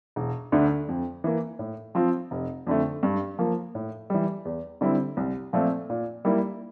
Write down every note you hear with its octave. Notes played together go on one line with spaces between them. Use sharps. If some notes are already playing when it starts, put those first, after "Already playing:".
E1
D2 D3 A3
F2
E3 A#3
A2
F3 C4 F4
F1
F2 D3 A3
G2
F3 A#3
A2
E3 G3
E2
D3 G3 C4 E4
C2
A#2 F3 A3 C4
A#2
G3 A#3 E4